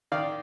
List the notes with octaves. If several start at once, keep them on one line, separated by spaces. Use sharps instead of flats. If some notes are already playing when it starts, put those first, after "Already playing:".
D#3 D5 F5